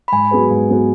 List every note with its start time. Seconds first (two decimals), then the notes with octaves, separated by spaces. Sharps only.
0.08 B5
0.12 G#2 G#5
0.31 F#3 B3 G#4 B4
0.50 G#2
0.69 F#3 B3 G#4 B4